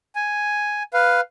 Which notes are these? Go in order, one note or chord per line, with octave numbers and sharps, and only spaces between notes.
G#5
B4 F5